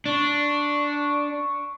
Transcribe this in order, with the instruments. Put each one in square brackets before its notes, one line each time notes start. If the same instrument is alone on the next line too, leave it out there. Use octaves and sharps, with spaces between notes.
[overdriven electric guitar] D4 [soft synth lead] C#6